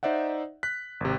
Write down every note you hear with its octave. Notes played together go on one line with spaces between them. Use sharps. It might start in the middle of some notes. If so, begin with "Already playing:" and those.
D#4 C5 D5 E5 F#5
F#6 B6
G#1 C3